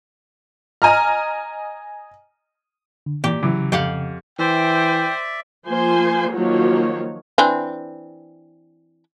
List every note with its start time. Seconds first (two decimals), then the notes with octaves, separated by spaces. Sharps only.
0.82 D#5 G#5 A#5 F6
3.06 D3
3.24 A#2 E3 G4
3.43 C#3 E3 F#3 D6
3.72 F2 G4 F5 F#5
4.39 E3 C5 D5 E5 G5
5.66 F3 A#3 C5 G#5 C6
6.32 D#3 F3 F#3 A#3 F#4 C#5
7.38 E3 C4 D4